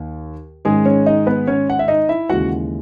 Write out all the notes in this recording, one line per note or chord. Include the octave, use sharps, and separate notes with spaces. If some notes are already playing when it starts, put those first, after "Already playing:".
Already playing: D#2 D#3
G#2 D#3 G#3 C#4 G#4
C#4 C#5
D#4 D#5
B3 B4
C#4 C#5
F#5
E5
D#4 D#5
E4 E5
D#2 C#3 E3 G#3 F#4 F#5